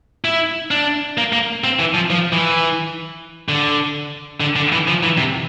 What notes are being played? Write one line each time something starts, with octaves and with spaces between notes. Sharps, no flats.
E4
D4
A#3
A#3
C4
E3
F3
F3
E3
D3
D3
D3
E3
F3
E3
C3